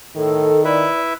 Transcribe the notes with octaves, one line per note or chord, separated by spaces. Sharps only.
A2 D#3 A4
E4 B4 D5 E5